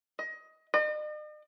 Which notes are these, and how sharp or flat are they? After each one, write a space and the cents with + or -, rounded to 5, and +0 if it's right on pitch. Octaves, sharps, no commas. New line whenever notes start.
D#5 +20
D#5 -45